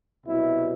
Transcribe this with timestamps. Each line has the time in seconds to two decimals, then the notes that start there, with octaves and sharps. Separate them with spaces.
0.25 C2 B2 F#3 E4